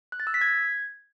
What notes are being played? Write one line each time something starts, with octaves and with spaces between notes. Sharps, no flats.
F#6
A6
E6
B6
G#6